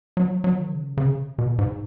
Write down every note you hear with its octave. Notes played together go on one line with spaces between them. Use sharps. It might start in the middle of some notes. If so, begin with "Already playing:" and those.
F#3
F#3
D#3
C#3
C#3
B2
G#2